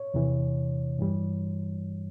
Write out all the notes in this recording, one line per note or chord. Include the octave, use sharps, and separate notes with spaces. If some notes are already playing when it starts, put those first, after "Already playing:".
Already playing: C#5
E2 C3 E3
G2 E3 G3